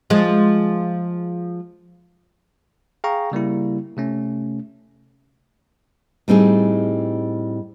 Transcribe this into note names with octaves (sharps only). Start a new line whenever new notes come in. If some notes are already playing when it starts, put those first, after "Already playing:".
F3 G#3
G#4 F5 G5 A#5 C#6
C#3 G3 A#3 E4
C3 A3 C#4
A2 G3 C4 D#4 G#4